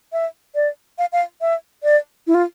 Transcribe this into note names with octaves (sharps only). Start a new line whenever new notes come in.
E5
D5
F5
F5
E5
D5
E4
F4